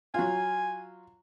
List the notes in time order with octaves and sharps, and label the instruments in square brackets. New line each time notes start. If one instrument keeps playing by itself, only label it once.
[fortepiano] F#3 F4 [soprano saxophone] G#5